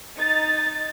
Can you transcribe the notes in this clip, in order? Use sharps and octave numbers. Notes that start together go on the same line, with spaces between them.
D#4 A6